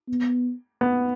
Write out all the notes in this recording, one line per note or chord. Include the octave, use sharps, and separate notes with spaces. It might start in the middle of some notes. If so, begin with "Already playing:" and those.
B3
B3